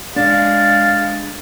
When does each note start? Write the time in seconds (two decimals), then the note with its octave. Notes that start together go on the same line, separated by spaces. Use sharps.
0.16 G#3 D4 F5 A6